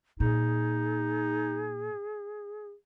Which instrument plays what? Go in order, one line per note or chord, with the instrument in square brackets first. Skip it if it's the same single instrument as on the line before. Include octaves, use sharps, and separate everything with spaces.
[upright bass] A#2 [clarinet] D#4 [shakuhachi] G#4